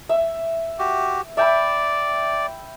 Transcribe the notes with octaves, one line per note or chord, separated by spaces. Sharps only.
E5
F#4 G4
D5 E5 G5 B5